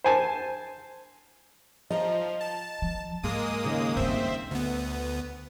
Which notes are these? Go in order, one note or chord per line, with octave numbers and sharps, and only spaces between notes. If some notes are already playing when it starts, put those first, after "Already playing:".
C5 G#5 A5
F3 D#5 A#5
A5
F3
G#2 G#3 A#3 D#6
D#2 C#3
G2 A3 C4 C5 E5
D2 B3